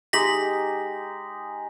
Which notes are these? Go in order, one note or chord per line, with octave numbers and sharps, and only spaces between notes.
G#3 D#4 G4 A#6 B6 F#7